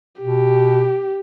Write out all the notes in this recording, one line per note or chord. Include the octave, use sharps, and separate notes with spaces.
B2 G4